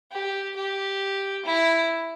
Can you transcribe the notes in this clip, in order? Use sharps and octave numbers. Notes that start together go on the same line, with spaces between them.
G4
G4
E4